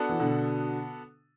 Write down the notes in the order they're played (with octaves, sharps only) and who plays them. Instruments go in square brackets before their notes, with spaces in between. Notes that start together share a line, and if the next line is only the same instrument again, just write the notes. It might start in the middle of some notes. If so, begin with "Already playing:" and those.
Already playing: [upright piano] B3 D4 F#4 A4
[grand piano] E3
B2 D3